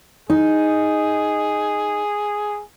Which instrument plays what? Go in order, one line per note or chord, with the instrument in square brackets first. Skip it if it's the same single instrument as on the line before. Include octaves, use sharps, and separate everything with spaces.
[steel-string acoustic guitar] D#4 [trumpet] G#4